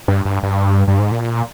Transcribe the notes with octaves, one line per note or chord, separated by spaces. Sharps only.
G2
G2
G2
G2
G#2
A#2